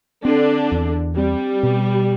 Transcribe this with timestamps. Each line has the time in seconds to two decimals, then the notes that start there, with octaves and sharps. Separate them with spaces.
0.25 D3 C4 D4
0.72 E2
1.17 G3 C4
1.63 B2